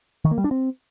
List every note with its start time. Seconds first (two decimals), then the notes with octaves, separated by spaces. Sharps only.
0.25 D#3
0.31 A#3
0.38 G3
0.44 D4
0.51 C4